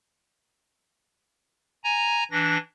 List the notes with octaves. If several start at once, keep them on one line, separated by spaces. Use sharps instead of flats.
G#5 A#5
E3 D4 A#6